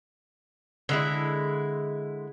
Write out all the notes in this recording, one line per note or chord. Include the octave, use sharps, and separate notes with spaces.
D3 G#3 E4